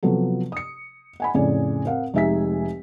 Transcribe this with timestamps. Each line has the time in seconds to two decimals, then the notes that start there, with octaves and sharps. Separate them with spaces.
0.03 C3 F3 F#3 B3 A4
0.52 D#6 C#7
1.20 F#5 G#5 B5
1.34 F2 A2 C#3 G#4 D5 G#5
1.85 C4 A#4 F5 F#5
2.14 F1 G#3 D#4 E5 G#5 B6